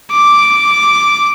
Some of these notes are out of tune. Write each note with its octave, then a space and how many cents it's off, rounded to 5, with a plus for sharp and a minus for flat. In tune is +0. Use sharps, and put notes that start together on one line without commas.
D6 -5